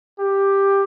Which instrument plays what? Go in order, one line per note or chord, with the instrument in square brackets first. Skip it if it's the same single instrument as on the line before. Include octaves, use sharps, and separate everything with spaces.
[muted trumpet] G4